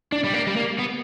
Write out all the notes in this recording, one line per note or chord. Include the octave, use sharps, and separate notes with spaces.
D4
G3
A#3
G3
A#3
B3